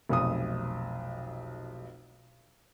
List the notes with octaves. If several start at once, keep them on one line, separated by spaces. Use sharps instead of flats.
F1 B1 D#6